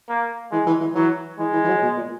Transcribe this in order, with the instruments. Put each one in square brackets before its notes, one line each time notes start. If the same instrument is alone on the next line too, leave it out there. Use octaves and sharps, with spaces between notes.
[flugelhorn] A#3
[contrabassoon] E3 [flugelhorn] G#3
[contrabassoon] E3
E3
[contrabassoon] E3 [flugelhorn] F#3
[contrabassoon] E3 [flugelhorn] G#3
[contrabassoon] E3
E3
F#3
B2
A#2